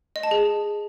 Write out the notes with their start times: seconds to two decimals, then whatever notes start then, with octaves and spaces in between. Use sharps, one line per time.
0.16 D#5
0.23 A5
0.31 G#4